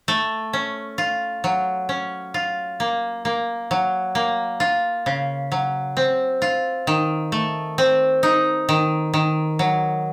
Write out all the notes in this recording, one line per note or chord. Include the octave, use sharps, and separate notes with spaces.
A3
C#4
F4
F#3
C#4
F4
A#3
A#3
F#3
A#3
F4
C#3
F#3
C4
F4
D#3
A3
C4
D#4
D#3
D#3
F#3